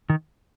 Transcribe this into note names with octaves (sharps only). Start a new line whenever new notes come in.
D#3